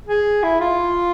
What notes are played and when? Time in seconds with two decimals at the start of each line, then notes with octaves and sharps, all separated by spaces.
0.08 G#4
0.43 E4
0.60 F4